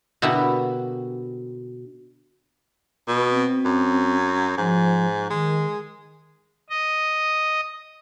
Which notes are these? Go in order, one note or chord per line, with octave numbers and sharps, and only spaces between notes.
B2 D3 A#3 E4 F#4 G4
B2
C4
F#2
G#2 F3
D#3 G#3
D#5